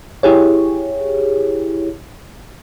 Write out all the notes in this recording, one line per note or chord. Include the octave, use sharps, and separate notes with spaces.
E4 G4 G#4 C#5